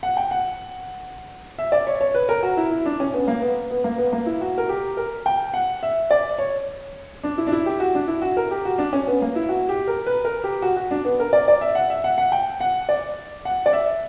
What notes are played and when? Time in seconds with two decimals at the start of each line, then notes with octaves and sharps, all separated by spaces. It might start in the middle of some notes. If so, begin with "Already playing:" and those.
0.03 F#5
0.17 G5
0.31 F#5
1.58 E5
1.72 D5
1.87 C#5
2.01 C#5
2.14 B4
2.29 A#4
2.43 F#4
2.57 E4
2.71 E4
2.86 D4
3.00 C#4
3.13 B3
3.28 A#3
3.42 B3
3.70 B3
3.84 A#3
3.98 B3
4.13 A#3
4.26 E4
4.41 F#4
4.58 A#4
4.69 G4
4.97 A#4
5.26 G5
5.54 F#5
5.83 E5
6.11 D5
6.38 C#5
7.23 D4
7.38 E4
7.47 D4
7.52 E4
7.66 G4
7.80 F#4
7.95 D4
8.08 E4
8.22 F#4
8.37 A#4
8.51 G4
8.65 F#4
8.78 D4
8.93 C#4
9.07 B3
9.22 A#3
9.36 E4
9.49 F#4
9.69 G4
9.88 A#4
10.06 B4
10.25 A#4
10.44 G4
10.62 F#4
10.77 F#4
10.91 D4
11.05 B3
11.20 A#4
11.33 D5
11.48 D5
11.61 E5
11.75 F#5
11.90 E5
12.04 F#5
12.18 F#5
12.32 G5
12.61 F#5
12.89 D5
13.45 F#5
13.66 D5
13.73 E5